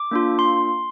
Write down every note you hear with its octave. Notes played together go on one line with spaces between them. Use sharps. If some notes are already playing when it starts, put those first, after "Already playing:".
Already playing: D6
A#3 D4 F4
C6